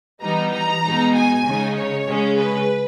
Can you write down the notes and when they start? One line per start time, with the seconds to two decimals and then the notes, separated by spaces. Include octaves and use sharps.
0.21 E3 G3 B3 D#4 A#5
0.53 A#5
0.83 B2 G#3 D#4
1.15 G#5
1.45 C#3 G#3 D#4
1.76 C#5
2.07 C#3 G#3 C#4
2.37 B4